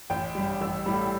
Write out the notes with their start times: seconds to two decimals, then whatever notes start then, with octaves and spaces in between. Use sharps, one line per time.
0.10 A1 G5
0.35 G2 G3
0.61 A1 E6
0.86 A2 G3 B5